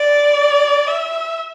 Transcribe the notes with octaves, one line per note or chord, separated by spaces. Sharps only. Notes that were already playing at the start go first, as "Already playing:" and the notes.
Already playing: D5
E5